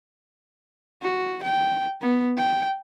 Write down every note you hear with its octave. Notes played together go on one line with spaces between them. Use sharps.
F#4
G5
B3
G5